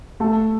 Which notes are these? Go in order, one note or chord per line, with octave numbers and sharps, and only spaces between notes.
A3 A4 A5